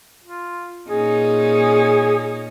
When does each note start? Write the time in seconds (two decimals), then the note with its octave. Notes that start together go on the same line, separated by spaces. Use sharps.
0.24 F4
0.89 A#2 C#4 D#4 G#4